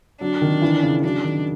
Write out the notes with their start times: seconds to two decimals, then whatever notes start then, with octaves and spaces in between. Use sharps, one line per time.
0.21 F#3 D4
0.41 D#3
0.62 E3
0.83 C#3
1.03 F#3 D4
1.24 D#3